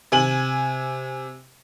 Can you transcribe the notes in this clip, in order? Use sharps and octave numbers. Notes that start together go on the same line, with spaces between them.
C3 G#5 F#7